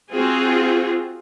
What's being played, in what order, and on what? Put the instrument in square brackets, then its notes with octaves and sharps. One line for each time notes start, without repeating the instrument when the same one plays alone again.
[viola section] C4 F4 F#4 G#4